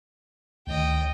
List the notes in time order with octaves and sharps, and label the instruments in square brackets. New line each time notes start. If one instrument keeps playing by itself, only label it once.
[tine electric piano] D2 D#3 [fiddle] D#5 G5